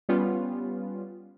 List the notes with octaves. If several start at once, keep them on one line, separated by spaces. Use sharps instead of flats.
G3 B3 C#4 F4